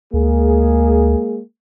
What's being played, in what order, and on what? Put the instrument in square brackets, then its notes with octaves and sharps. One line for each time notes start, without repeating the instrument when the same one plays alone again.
[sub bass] D2 [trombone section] G#3 A#3 G#4